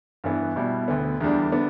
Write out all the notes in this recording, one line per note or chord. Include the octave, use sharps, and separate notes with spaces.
G2 E3 B3 E4
B2 G3 E4
D2 D3 B3
E2 D3 G3 D4
D3 B3 D4